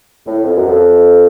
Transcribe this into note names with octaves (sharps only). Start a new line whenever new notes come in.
A2
F2
F#2
F2